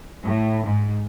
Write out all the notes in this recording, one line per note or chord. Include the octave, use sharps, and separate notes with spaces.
A2
G#2